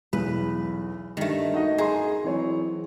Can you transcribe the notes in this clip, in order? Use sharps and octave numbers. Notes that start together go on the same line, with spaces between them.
B1 E2 B4
G2 D#3 A3
D#4 F#4 D#5
G#4 A#5 C6
E3 F#3 C4 C#5